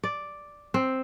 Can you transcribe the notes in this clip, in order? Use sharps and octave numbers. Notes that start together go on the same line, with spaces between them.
D5
C4